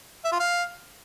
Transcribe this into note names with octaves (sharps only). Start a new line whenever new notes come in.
E5
F4
F5